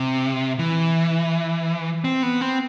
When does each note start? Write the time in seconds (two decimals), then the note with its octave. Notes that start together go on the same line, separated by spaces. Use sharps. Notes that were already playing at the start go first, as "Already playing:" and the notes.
Already playing: C3
0.59 E3
2.04 C4
2.23 B3
2.41 C4